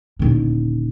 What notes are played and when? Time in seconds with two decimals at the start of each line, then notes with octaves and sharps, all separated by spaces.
0.19 D#1 D3